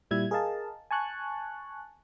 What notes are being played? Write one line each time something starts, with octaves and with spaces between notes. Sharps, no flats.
A#2 G3 E4 E5 G#6
G#4 A#4 D#5 F5 A5
G#5 A5 C#6 F#6